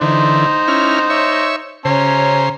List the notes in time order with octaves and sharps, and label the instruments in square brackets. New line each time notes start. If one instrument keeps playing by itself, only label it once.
[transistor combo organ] D3 E3 [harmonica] D#4 C5
[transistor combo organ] C#4 E4 F6
C#5 E5
[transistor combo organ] C#3 C5 [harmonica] C#4 A#5